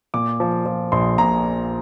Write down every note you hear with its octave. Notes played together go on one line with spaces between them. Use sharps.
A#2 D6
F3
F3
A#1 C6
A#2 A#5